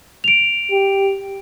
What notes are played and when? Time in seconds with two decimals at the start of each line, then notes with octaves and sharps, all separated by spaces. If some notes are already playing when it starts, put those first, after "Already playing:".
0.24 D7 F7
0.71 G4